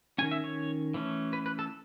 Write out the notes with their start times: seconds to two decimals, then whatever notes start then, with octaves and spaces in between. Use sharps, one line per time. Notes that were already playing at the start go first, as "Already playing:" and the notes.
0.18 D#3 A3 C#4 G#5
0.31 E5
0.44 C#5
0.94 E3 A3 C#4
1.33 B4
1.46 B4
1.59 A4